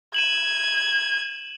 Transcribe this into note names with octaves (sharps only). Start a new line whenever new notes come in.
G#6 D#7 E7 F#7